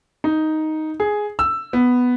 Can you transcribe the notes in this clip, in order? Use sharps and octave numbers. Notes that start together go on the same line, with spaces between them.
D#4
G#4
E6
B3